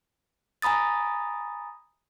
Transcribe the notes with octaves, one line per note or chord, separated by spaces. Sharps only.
G#5 A#5 B5 D#6 A6